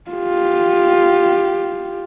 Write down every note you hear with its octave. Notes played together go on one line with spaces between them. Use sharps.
F4 G4